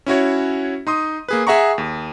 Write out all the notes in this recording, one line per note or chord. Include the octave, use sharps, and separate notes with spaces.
C#4 E4 F#4 C#5
D#4 C6 D#6
A#3 G#4 B4
G#4 E5 F#5 A#5 C#6
D#2